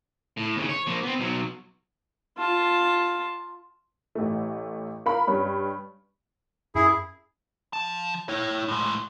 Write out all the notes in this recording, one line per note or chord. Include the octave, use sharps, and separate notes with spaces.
A2
D#2 C#3
C#5
F3 A#3
B3 C4
B1 F#3
F4 A5
A1 A3
A#4 F5 B5
G2 C#4 B5
F#2 E4 G#4
F3 A5
E4 C#5
A2 G#3